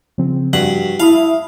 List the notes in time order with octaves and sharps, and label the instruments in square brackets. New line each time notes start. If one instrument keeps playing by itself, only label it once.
[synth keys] C#3 F3 C4
[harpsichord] G2 F#5 [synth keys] F3 F#4
[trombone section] E4 [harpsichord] F5 [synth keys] A5 B5 D#6